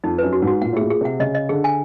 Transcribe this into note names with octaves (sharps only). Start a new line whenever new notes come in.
F2 D#4
F#2 B4
F#4
G#2
F#4
A#2 F#5
A2
G#4
A#2
G#4
C3 F#5
C#3 D#5
D#5
D3 G#4
G#5